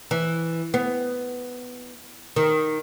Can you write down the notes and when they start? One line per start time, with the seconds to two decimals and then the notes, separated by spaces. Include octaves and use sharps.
0.11 E3
0.74 B3
2.36 D#3